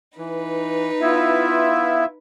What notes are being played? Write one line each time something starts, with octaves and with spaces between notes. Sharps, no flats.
E3 D#4 B4
B3 E4 F4 E5